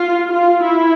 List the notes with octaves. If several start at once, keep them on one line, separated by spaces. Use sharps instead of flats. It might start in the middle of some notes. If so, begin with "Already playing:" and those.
Already playing: F4
F4
E4